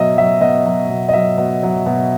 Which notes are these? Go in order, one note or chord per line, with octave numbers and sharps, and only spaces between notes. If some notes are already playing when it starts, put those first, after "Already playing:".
Already playing: B2 F#3 D#5 E5
F#3 E5
B2 D#5
F#3
B2
D#5
F#3 E5
B2
F#3
B2